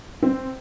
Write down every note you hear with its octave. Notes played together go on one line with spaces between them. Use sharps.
C4